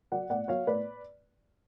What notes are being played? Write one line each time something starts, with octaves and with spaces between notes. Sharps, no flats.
F#3 D5 F#5
A2 D5 F#5
F#3 C#5 F5
A2 B4 D5